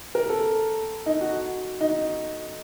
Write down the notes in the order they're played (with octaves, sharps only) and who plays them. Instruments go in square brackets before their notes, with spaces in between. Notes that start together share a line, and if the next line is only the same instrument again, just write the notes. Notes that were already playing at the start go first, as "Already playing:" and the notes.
[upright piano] A#4
A4
D#4
F#4
D#4